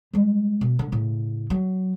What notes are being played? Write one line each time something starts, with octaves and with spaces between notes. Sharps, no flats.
G3 G#3
B2
D3
A2 C#3
F#3